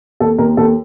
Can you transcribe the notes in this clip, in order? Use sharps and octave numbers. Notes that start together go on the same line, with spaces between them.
D#2 A4
D#2 A#4
D#2 A4